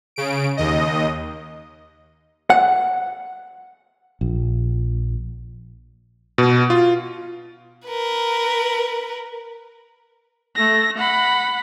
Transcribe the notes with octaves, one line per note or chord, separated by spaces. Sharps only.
C#3 D7
D#2 D#5
F#5
A#1
B2
F4
A#4 B4
A3 A#6
F#5 B5